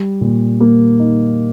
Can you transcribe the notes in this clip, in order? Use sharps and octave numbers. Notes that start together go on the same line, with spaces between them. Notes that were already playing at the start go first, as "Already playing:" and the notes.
Already playing: G3
A#2
A#3
D#4